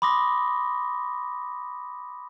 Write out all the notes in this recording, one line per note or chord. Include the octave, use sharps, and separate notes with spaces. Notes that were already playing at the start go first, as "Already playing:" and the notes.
B5 C6 D6 D#6 A#6